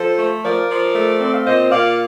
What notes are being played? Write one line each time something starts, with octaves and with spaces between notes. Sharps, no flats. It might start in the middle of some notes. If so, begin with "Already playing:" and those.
Already playing: F3 A4 C5
A3
F3 A#4 D5
F3
A3
C4
F5
A#2 C5 D#5
A#2 D5 F5